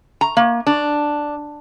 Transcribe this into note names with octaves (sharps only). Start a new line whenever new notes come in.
A#5
A#3
D4